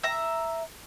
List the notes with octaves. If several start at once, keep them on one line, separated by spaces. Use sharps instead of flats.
E5 A#5